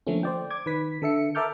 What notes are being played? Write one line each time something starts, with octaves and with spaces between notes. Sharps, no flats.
D3 F3 A3 A#3 C#4
C5 D5 G5
D6 G#6
D#3 B4 B6
D3 A4 E5 C#7
A#4 E5 A5 D6 F6 G6